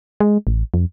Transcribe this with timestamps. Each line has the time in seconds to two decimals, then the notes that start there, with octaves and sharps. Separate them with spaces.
0.20 G#3
0.47 A1
0.74 F2